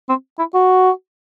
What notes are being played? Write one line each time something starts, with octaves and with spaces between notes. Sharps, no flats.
C4
E4
F#4